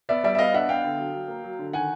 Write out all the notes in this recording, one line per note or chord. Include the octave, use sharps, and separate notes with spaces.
B3 D5 E5
G3 D5 E5
E5
B3 D#5 F5
D4 E5 F#5
B3 F5 G5
D3
F#3
F#3
A#3
F#3
D3
D#3 F#5 G#5